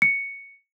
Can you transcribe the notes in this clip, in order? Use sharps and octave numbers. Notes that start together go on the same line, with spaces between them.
C#7